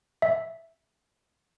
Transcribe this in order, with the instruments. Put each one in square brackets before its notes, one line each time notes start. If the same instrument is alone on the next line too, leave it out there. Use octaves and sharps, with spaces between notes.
[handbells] E5